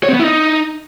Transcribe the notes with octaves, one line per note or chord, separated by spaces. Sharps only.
C#5
C4
B3
E4
D#4